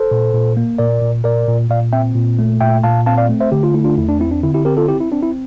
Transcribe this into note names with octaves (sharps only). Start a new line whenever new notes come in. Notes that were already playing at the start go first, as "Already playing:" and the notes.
Already playing: A4 C5
A#2
A#2
A#3
A#2 A#4 D5
A#2
A#2 A#4 D5
A#2
A#2 D5 F5
C4 E5 G5
A#2
A3
A#2 E5 G5
A#2 F5 A5
C4 F5 A5
D5 F5
A3
C5 E5
D3 G4
F4
A3 E4
D4 F4
E2 E4
D4
C4 E4
D4
D3 E4
E4 G4
C4 G4 A#4
F4 A4
C4 E4 G4
E4
C4 D4
E4